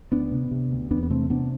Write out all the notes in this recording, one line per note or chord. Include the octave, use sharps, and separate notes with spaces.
D2 B3 D4
C3
C3
D2
E2 B3 D4
B3
C3 A3 C4
C3 B3 D4